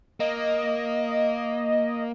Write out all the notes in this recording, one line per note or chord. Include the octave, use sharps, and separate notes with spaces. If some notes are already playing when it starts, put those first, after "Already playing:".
A#3 D#5